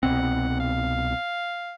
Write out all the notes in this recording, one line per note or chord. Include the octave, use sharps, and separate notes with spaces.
C2 B2 C4 F#5
F5